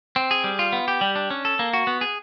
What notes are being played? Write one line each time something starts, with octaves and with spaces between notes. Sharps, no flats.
C4
G#4
G3
F4
B3
G4
G3
D4
C#4
A4
A#3
F#4
B3
G#4